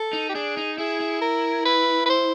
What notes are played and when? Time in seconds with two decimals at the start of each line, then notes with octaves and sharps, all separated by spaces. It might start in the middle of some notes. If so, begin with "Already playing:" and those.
Already playing: A4
0.13 D#4
0.29 G4
0.34 D4 G#4
0.57 D#4
0.78 E4 G#4
1.00 E4
1.21 A#4
1.65 B4
2.06 B4
2.09 C5